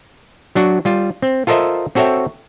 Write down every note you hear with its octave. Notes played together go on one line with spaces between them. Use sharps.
F#3 D4 F#4
G3 F4
C4
F4 A4 A#4 C5 D#5 E5
C4 F#4 A4 C#5 E5 G5